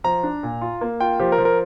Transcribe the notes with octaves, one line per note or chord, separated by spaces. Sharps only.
F3 A#5
D4
A#2
F4
A#3
F4 G5
F3 G4
A#4
F3
A#4